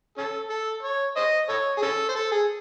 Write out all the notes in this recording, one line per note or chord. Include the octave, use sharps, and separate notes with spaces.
C#4 A4
A4
C#5
C5 D#5
A4 C#5
G#4
C#4 A4
C5
A4
G#4